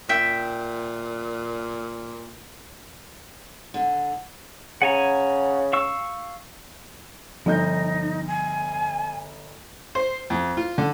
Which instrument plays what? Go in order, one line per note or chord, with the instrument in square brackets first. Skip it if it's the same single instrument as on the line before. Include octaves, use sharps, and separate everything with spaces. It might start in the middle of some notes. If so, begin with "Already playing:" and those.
[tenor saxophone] A#2 [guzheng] E5 G5
[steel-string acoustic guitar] D3
[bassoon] C#3 [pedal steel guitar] F#5 G#5 A#5
[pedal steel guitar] F5 C#6 E6
[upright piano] G1 D#5 G6 [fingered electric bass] F3 [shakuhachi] D#4
[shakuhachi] G#5
[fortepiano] C5
F2
F4
D3